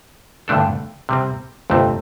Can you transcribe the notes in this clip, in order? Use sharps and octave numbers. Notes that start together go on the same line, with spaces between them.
G2 D3 A3 D4 A4
C3 G3 C4
G1 F2 C3 A3 C4